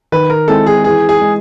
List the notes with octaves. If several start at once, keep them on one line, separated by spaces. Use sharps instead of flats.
D#3 B4
A#4
G#3 C4 E4 A4
G#4
E3 G#4
G#4
G#3